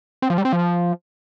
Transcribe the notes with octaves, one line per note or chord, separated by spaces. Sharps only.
C4
F3
G3
C4
F3